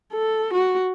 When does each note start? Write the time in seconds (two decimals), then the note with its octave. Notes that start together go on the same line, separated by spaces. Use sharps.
0.13 A4
0.54 F#4